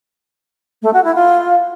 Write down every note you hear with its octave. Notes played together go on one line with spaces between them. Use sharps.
A3
F#4
E4
F4